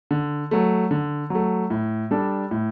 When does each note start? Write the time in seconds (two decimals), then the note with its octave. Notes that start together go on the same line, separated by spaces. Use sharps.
0.11 D3
0.51 F#3 A3
0.91 D3
1.30 F#3 A3
1.70 A2
2.11 G3 D4 A4
2.51 A2